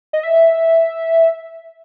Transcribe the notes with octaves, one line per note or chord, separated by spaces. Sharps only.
D#5
E5